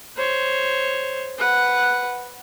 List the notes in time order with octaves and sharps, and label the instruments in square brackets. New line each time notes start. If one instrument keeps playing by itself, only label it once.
[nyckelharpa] C5 C#5
B4 F#5